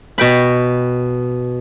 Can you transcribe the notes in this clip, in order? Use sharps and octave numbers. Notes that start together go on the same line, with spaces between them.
B2 G5 B5